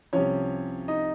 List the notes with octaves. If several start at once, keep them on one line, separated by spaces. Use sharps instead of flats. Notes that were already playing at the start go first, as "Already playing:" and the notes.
C2 C3 F3 C#4 C#5
D#4 D#5